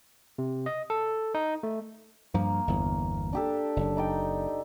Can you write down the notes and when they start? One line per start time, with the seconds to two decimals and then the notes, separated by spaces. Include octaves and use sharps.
0.38 C3
0.66 D#5
0.90 A4
1.35 D#4
1.63 A3
2.34 G2 F3 A#3
2.68 G1 E2
3.33 D4 G4 A4
3.76 F#1
3.97 D#4 D5 G5